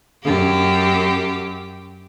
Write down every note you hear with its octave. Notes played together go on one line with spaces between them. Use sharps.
F#2 G4